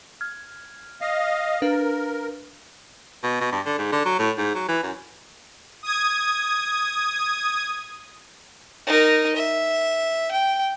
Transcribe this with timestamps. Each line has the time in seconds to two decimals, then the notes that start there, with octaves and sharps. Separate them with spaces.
0.21 F6 G#6
1.01 D#5 F5
1.62 D4 A#4 B4 F5
3.24 B2
3.41 B2
3.52 G2
3.66 D3
3.78 G#2
3.92 D3
4.05 F#3
4.19 A2
4.38 G#2
4.55 F#3
4.68 E3
4.83 F#2
5.83 D#6 G#6
8.87 D#4 A#4
9.36 E5
10.32 G5